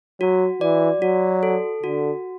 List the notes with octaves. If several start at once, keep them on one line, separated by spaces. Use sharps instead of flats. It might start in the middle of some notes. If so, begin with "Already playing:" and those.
F#3 F#4
E3 D5
F#3 F#4
A4
D3 F#4